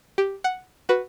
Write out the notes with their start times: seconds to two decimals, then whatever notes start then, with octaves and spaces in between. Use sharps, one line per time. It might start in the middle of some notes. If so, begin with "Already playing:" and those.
0.18 G4
0.44 F#5
0.89 F#4 B4